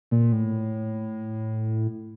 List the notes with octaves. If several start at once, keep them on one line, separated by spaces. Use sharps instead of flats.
A#2
A2